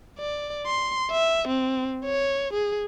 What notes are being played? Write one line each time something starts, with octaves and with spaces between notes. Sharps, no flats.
D5
C6
E5
C4
C#5
G#4